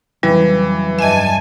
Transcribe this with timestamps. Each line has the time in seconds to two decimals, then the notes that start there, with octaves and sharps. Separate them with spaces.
0.23 F2 C#3 E3 F#3 G3
0.99 G2 D#5 E5 G#5 A5